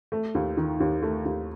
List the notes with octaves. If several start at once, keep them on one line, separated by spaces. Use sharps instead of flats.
A3
D#2
D#3
D#2
A3
D#2